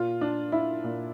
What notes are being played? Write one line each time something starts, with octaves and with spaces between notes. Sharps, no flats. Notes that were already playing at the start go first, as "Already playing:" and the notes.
Already playing: A#2 F4
D4
E4
A#2